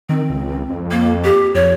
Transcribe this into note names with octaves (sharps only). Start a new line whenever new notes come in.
D#3 C4
C#2
F2
A#3
G4
F2 C#5